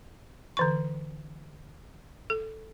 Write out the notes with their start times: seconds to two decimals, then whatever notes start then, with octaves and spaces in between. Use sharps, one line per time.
0.57 D3 E3 C#6
2.30 A4